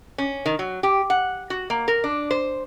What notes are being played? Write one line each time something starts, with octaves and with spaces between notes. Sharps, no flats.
C#4
D#3
F#3
G4
F#5
F#4
A#3
A#4
D4
C5